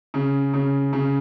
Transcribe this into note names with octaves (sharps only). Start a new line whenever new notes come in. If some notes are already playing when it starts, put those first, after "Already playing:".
C#3
C#3
C#3